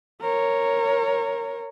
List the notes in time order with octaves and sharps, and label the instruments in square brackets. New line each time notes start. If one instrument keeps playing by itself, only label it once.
[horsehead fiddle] A#4 C#5